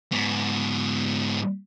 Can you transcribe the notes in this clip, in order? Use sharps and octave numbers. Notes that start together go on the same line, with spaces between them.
G#2 B3